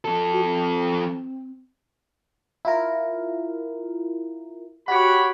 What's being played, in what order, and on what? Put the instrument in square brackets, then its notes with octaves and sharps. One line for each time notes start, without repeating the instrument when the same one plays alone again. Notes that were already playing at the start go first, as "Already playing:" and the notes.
[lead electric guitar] F3 A4
[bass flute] F#4
C4
[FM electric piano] E4 F4 A#4
[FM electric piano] F#4 F#5 [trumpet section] G4 C#5 B5